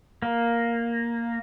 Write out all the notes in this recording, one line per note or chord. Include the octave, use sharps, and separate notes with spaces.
A#3